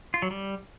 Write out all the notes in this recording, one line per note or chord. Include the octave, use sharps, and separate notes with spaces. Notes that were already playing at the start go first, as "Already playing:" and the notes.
F4
F#3
G3